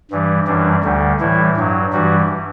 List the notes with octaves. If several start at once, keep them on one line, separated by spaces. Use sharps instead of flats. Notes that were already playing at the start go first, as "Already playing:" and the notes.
G2 E3 G3
F#2 E3 G3 D4
D2 D3 G3
A2 E3 G3 E4
G2 F#3
G2 E3 G3 F#4